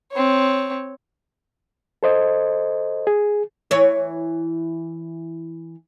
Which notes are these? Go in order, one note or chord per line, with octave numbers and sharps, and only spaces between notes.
C4 C#5
A4 C5 D#5
G#4
E3 C#5